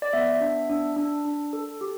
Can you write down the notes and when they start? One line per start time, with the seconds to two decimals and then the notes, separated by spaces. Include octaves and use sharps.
0.02 D5
0.13 B3 E5
0.41 D4
0.69 D4
0.96 D4
1.25 D4
1.53 A4
1.81 G4